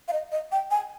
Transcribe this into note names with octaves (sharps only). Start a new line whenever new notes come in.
F5
D#5
D#5
G5
G#5